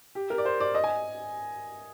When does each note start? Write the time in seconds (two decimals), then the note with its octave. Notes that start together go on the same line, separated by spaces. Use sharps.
0.15 G4
0.30 A#4
0.38 D5
0.45 C5
0.60 D5
0.75 D#5
0.84 G#5